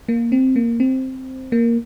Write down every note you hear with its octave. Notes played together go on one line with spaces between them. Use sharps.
A#3
C4
A#3
C4
A#3